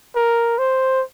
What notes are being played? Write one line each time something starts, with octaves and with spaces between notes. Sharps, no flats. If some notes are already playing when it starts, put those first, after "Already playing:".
A#4
C5